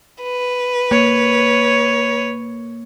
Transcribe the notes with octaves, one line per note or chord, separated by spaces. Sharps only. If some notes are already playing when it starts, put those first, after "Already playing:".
B4
A#3 C#5